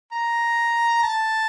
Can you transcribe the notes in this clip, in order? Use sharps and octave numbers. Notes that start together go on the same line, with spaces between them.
A#5
A5